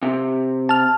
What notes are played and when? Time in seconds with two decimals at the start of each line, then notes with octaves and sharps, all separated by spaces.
0.03 C3
0.69 A5 F6